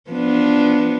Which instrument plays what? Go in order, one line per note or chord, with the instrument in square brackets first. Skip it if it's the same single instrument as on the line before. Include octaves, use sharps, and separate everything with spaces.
[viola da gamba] F3 B3 D4